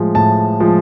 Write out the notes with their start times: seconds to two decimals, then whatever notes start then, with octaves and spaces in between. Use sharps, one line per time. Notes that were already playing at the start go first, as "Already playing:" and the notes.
Already playing: A2 F3 G#3
0.15 A2 A5
0.60 F3 G#3